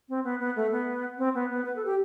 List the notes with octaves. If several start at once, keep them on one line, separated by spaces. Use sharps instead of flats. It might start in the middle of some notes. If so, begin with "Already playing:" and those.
C4
B3
B3
A3
B3
C4
B3
B3
B4
A4
G4